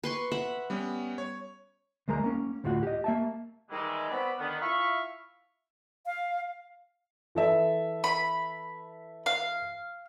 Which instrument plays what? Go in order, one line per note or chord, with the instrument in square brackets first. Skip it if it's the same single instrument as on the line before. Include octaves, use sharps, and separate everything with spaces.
[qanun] B4 C6 C#6
E5 F#5 B5
[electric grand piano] G3 B3 C#4
C#5
[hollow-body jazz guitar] D2 G#3 A#4 A#5
A#3 C#4
D2 A2 F4 F#4 F#5
G4 D#5
A#3 E5 A5
[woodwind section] D#3 E3 G3 G#3
B3 C4 C#5 D5 B5
D3 D#3 B3
E4 F4 E5 F5 B5 C#6
[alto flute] F5
[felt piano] E3 A4 E5
[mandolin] B5
F5